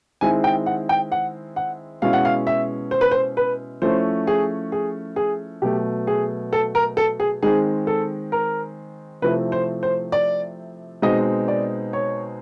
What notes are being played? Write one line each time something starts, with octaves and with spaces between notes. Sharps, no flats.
D#3 G#3 C4 E4 G#5
G5
F#5
G5
F#5
F#5
B2 G#3 C#4 E4 F5
F#5
F5
E5
C5
B4
C5
B4
F3 A3 C#4 E4 C5
G#4
G#4
G#4
B2 F#3 A3 G4
G#4
A4
A#4
A4
G#4
D#3 G#3 C4 G#4
A4
A#4
C3 F3 A3 C4 E4 B4
C5
C5
D5
B2 G#3 C4 D#4 D#5
D5
C#5